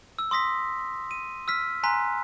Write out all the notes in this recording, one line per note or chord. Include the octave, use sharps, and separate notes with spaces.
E6
C6 D#6 A#6 B6
D#7
E6 F6 B6
G#5 A#5 C6 F#6 B6